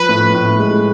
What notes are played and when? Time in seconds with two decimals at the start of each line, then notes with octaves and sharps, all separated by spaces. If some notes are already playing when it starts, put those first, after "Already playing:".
Already playing: F3 B4
0.09 A2
0.34 A2
0.60 G#3